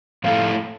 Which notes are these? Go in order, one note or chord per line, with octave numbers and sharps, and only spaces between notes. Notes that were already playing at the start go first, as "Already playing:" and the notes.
A2 F3 A3 E4 A4 F5